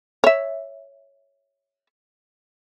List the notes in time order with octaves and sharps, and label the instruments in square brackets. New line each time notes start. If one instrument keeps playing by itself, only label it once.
[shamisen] C#5 E5